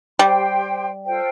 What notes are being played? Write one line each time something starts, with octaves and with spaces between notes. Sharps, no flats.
G3 G4 C5 G5 C6
F4 A4 C5 G5